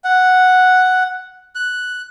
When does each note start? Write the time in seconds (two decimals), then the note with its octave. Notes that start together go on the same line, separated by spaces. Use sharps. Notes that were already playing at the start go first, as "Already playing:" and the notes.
0.04 F#5
1.55 F#6